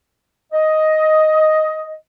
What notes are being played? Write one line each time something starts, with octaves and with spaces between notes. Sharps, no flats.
D#5